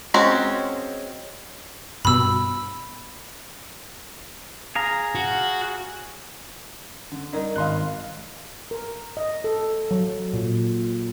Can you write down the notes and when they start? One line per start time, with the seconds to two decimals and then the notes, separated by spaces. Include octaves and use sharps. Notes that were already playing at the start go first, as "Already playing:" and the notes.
0.14 G#3 C4 C#4 F#4
2.05 G2 B2 B5 E6
4.75 G#4 F5 A#5
5.15 F#4
7.12 D3
7.33 G3 D#4 A#4 D5
7.56 G#1 D#5 F5 C6 F#6
8.71 A#4
9.17 D#5
9.44 A4
9.91 F#3
10.33 A#2